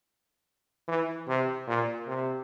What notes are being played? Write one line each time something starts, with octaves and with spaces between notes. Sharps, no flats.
E3
C3
A#2
C3